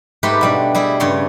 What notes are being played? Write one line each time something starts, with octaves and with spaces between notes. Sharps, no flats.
G#2 A3 G4 B4 C6
B2 G3 D4
G3 E4 G#4
G2 C#3 C#5 C6